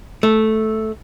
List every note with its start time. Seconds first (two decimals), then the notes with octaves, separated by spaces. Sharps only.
0.23 A3